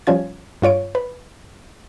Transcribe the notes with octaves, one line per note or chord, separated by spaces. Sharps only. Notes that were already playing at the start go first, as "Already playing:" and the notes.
F3 G3 C#4 F4 G#6
G2 F4 C#5 D7
B4